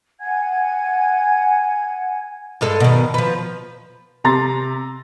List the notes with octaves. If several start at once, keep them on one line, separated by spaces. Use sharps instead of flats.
F#5 G#5 G#6
G2 G#3 A4
B2 D#3
F3 B4
C3 A#5 C6 A6